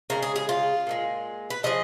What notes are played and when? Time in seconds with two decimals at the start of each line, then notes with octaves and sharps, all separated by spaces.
0.10 C#3 G#3 A#4
0.23 G#4
0.36 G#4
0.49 F4
0.87 A#2 F3 G#3
1.50 B4
1.63 C#3 F3 G#3 D#5